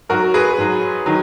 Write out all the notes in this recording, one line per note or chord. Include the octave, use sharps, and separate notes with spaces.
G#2 F#3 F#4 A#4
G#4 B4
G#2 F#3
D#3 F#3